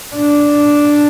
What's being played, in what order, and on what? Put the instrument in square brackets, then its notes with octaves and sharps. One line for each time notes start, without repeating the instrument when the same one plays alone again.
[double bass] D4